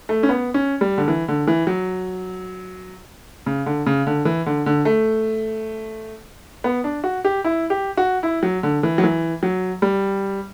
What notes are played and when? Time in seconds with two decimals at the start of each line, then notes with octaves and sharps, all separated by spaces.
0.09 A3
0.23 C#4
0.29 B3
0.54 C#4
0.81 G3
0.98 D3
1.08 E3
1.28 D3
1.47 E3
1.67 F#3
3.46 C#3
3.66 D3
3.86 C#3
4.07 D3
4.25 E3
4.46 D3
4.66 D3
4.85 A3
6.64 B3
6.84 D4
7.04 F#4
7.25 G4
7.44 E4
7.70 G4
7.97 F#4
8.23 E4
8.43 F#3
8.63 D3
8.83 E3
8.98 F#3
9.03 E3
9.43 F#3
9.82 G3